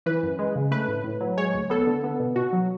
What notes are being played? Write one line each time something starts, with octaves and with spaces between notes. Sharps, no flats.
E3 B4
F#2
G#3
C#3
A3 B4
A2
A2
F#3
G#3 C#5
D2
B3 A4
D3
B3
B2
B2 F#4
F#3